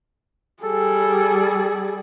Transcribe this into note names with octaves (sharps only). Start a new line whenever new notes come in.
G3 G#4 A4